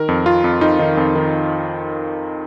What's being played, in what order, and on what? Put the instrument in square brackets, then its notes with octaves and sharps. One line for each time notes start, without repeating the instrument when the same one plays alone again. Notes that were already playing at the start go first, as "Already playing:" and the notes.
Already playing: [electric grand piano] D#3 A#4
F2
F2 F4
F2
F2 D#4
D#3
F2
D#3